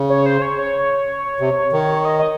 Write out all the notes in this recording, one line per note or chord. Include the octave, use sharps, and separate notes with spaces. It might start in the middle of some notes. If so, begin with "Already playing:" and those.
Already playing: C#3
C#5
C5
C#5
C#5
C3
D#3
D#5
D#5